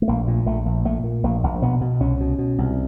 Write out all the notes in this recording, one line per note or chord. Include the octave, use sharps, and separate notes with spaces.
A3
A#1 A#3
A#2
A#1 A3
A#1
A#2 A3
A#2
A#1 A#3
A#1
B2 B3
B2
C2 C#4
B2
B2
C2